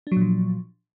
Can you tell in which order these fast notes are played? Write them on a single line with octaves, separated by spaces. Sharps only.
D4 F#3 A#2 F3